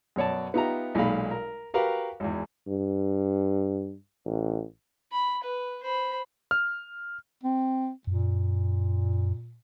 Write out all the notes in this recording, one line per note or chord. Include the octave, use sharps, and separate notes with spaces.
F#2 B2 C#5 D5 A5
B3 D#4 F4 G4 E5 A#5
B1 A#2 G#3 D#4 F5 B5
A#4
F#4 G4 A#4 B4 F5
G#1 E2
G2
A1
B5
B4
C5 B5
F6
C4
F#2 A#2